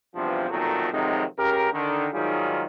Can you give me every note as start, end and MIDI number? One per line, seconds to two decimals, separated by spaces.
0.15 0.48 40
0.15 0.48 43
0.15 0.48 48
0.15 0.48 53
0.51 0.91 35
0.51 0.91 41
0.51 0.91 46
0.51 0.91 51
0.51 0.91 54
0.51 0.91 57
0.92 1.24 41
0.92 1.24 48
0.92 1.24 51
0.92 1.24 54
0.92 1.24 56
0.92 1.24 63
1.38 1.72 37
1.38 1.72 49
1.38 1.72 67
1.38 1.72 70
1.73 2.07 50
1.73 2.07 51
2.13 2.65 44
2.13 2.65 51
2.13 2.65 54
2.13 2.65 55
2.13 2.65 65
2.13 2.65 68